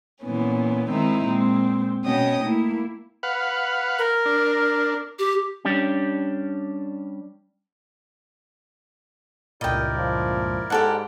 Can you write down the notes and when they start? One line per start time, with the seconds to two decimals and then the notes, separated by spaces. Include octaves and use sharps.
0.22 A#2 E3 B3 C#4
0.90 D#3 G#3 C4 D#4 E4
1.24 A#2 G#3 C4
2.05 B2 B3 C#4 D#5 G5 D#6
2.42 A3 A#3 E4
3.23 B4 F5 F#5
3.99 A#4
4.26 D4
5.19 G4
5.65 G3 C#4 D4 G4
9.61 C#2 G2 A#2 E4 A#4 D5 D#5 G5
9.97 F3
10.70 G#2 G4 A4 F#5